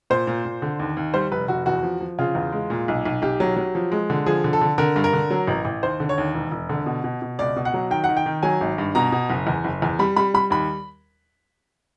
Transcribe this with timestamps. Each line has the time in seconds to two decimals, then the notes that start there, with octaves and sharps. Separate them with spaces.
0.10 A#2 C5
0.27 A#2
0.45 A#2
0.62 D3
0.79 D#2
0.97 D#2
1.14 G3 C5
1.31 F1 B4
1.48 F1 F#4
1.66 E2 F#4
1.83 F3
2.00 F3
2.19 C#3 F4
2.35 E2
2.52 G#3
2.70 A#2
2.88 B1
3.05 B1
3.22 B1 G4
3.40 F#3
3.57 F#3
3.75 F3
3.92 G#3
4.10 D3
4.26 F3 G#4
4.44 D3
4.53 A4
4.61 D3
4.78 D3 A#4
4.96 G2
5.04 A#4
5.13 D3
5.31 F#3
5.47 A1
5.65 A1
5.83 D#2 C5
6.00 D3
6.09 C#5
6.18 D#2
6.34 E1
6.52 E1
6.69 D3
6.86 B2
7.04 B2
7.22 B2
7.39 C#2 D5
7.56 B2
7.65 F#5
7.74 F#3
7.90 D#3 G5
8.04 F#5
8.09 D#3
8.17 G5
8.26 D#3
8.43 F#3 G#5
8.61 G#1
8.78 G2
8.95 B2 A#5
9.12 B2
9.29 F#1
9.47 E2
9.64 F#1
9.82 E2
9.99 G3 B5
10.16 G3 B5
10.34 G3 B5
10.51 D#2 B5